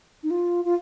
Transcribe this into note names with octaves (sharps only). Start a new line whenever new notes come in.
D#4
F4
F4